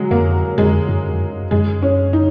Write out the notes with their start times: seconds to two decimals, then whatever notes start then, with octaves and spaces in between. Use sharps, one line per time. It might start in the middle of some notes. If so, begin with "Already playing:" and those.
Already playing: F#3 G#3
0.11 F2 A#3
0.58 F2 G#3
0.89 F#2
1.11 F2
1.20 F#2
1.51 F#2 G#3
1.82 C#4
2.13 D#4